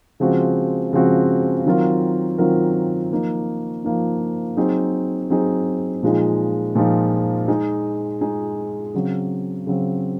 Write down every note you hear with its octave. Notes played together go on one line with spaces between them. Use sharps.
C#3 F3 G#3 C4 F#4
C#3 F3 G#3 C4 F#4
D#3 F#3 C4 F4 A#4
D#3 F#3 C4 F4 A#4
F3 A#3 D#4
F3 A#3 D#4
F#3 C4 D#4 G#4
F#3 C4 D#4 G#4
A#2 F3 G#3 D#4
A#2 F3 G#3 D#4
G#3 D#4 G#4
G#3 D#4 G#4
C#3 F#3 C4
C#3 F#3 C4